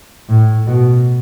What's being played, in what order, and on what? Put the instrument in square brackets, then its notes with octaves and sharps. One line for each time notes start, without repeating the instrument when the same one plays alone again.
[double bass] A2
B2